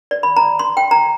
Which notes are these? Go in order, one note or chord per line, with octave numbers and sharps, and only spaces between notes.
D5
B5
A#5
C6
G5
A#5